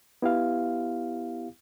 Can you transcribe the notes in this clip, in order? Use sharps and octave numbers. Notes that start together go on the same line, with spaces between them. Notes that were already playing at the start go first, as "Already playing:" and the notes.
B3 E4 G4 F5